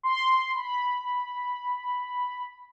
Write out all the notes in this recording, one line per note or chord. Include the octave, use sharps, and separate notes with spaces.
C6
B5